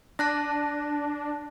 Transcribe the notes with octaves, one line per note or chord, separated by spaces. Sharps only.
D4 A5 F#6 A#6